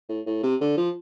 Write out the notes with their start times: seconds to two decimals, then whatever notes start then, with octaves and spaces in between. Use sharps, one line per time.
0.09 A2
0.26 A2
0.43 C3
0.61 D3
0.78 F3